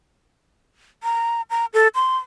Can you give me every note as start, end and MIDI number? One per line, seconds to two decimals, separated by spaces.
1.03 1.42 82
1.50 1.65 82
1.74 1.88 69
1.95 2.17 84